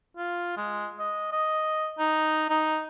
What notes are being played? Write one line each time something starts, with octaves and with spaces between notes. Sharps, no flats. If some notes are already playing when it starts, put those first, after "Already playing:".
F4
G#3
D#5
D#5
D#4
D#4